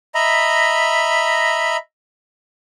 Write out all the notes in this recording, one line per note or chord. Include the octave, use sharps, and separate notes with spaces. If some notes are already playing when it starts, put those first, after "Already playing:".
D#5 E5 A#5 B5